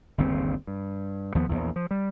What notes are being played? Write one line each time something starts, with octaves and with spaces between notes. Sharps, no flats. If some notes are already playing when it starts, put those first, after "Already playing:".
G1 D#2 C#3 C4
G2
D#2 F3 B3
A#1 E2
F3
G3